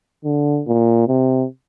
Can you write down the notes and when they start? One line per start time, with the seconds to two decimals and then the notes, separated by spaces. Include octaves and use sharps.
0.25 D3
0.67 A#2
1.08 C3